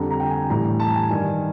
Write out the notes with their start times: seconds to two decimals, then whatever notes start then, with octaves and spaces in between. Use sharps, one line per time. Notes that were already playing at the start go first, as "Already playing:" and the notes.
Already playing: F2 D3 G3 A#5
0.11 A#5
0.20 G5
0.30 G#5
0.49 A2 E3 G3 A#5
0.65 A#5
0.80 A5
0.95 G#5
1.09 G2 D#3 G3 G#5